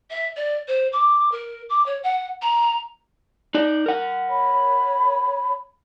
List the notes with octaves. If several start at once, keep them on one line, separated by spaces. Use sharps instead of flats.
E5
D5
C5
D6
A#4
D6
C#5
F#5
A#5
D#4 D5
A#4 F#5
C#5 B5